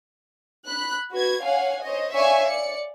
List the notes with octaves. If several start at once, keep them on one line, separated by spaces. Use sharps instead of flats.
B5 F#6
F#4 B4 G#6
C#5 F5 F#5 G#5
C5 C#5 D#5
C#5 D5 E5 F5 G#5 C#6
D5 C#7